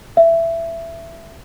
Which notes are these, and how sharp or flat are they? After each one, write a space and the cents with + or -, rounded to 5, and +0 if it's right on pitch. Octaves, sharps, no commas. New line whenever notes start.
E5 +15